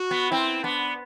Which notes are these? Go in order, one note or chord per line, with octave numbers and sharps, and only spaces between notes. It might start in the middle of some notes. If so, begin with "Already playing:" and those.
Already playing: F#4
B3
C4 E4
B3 D4